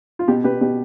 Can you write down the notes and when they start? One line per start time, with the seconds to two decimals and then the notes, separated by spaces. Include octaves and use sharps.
0.19 F4
0.28 B2 G4
0.44 B2 G4 B4
0.61 B2 G4